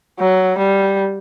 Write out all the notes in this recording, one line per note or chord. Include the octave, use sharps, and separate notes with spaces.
F#3
G3